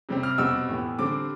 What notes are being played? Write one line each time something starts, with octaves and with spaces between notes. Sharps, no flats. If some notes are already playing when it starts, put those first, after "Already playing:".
C3 G3 C4
F6
B2 G3 C4 E6
A2 E3 B3
D3 G3 C4 D6